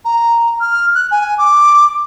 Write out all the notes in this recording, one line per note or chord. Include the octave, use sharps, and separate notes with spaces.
A#5
F6
F#6
G#5
D6